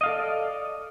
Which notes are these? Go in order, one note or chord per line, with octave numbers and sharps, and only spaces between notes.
A4 D5 D#5 F5